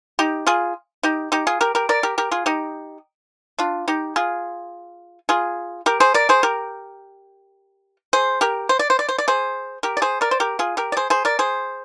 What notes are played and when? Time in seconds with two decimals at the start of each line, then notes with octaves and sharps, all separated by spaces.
0.19 D#4 G4
0.47 F4 G#4
1.03 D#4 G4
1.32 D#4 G4
1.47 F4 G#4
1.61 G4 A#4
1.75 G4 A#4
1.89 A#4 D5
2.03 G4 A#4
2.18 G4 A#4
2.31 F4 G#4
2.46 D#4 G4
3.59 D4 F4
3.88 D#4 G4
4.16 F4 G#4
5.29 F4 G#4
5.86 G4 A#4
6.00 G#4 C5
6.14 A#4 D5
6.29 G#4 C5
6.43 G4 A#4
8.13 G#4 C5
8.41 G4 A#4
8.69 C5
8.79 D5
8.90 C5
8.99 D5
9.09 C5
9.18 D5
9.28 G#4 C5
9.83 G4 A#4
9.97 D5
10.02 G#4 C5
10.21 A#4 D5
10.31 C5
10.40 G4 A#4
10.59 F4 G#4
10.77 G4 A#4
10.92 D5
10.97 G#4 C5
11.10 G#4 C5
11.25 A#4 D5
11.39 G#4 C5